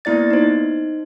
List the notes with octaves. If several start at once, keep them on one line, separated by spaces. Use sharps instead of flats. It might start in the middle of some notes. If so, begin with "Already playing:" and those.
A#3 B3 E4 D5 A6
D#4 C5